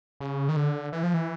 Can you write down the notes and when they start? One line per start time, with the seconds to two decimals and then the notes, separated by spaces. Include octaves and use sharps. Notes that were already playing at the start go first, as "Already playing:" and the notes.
0.20 C#3
0.49 D#3
0.56 D3
0.92 E3
1.03 F3
1.14 E3